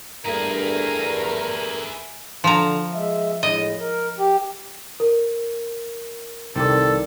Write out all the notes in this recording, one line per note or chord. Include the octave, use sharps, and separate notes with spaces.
G2 A3 E4 G#4 A#4 A#5
D3 F3 A#5
G#3 E5
A2 G#3 D#5
A#4
G4
A#4
C2 C3 D#3 A4 D5